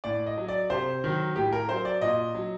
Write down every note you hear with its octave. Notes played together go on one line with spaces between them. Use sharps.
A2 D5
D#5
F#3
D5
C3 C5
D#3 F#3
A2 G4
A#4
F#3 C5
D5
A#2 D#5
F#3